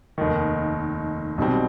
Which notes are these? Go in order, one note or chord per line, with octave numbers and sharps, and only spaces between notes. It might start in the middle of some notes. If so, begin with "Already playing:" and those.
F1 D#2 D#3
B1 B2 G3 C4